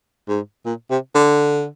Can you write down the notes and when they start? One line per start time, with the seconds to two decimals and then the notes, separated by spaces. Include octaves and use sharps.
0.29 G#2
0.66 A#2
0.90 C3
1.15 D3